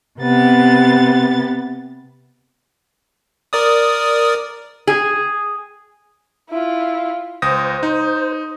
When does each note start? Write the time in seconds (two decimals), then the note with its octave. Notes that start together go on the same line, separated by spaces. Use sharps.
0.18 C3 B3 A6
3.53 A#4 D5 D#6
4.87 G#4
6.50 E4 F4
7.42 C#2 C5 D#6 A#6
7.83 D#4